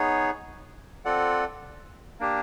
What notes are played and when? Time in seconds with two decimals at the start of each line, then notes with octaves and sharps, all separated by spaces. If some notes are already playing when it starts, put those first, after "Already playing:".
Already playing: B3 D#4 G#4 C#5
1.05 C4 F4 A4 D5 F#5
2.20 A#3 D4 G4